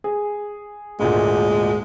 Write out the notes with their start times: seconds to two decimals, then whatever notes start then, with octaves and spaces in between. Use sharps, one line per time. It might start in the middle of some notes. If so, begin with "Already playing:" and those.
0.04 G#4
1.00 G#1 D2 A#2 G#3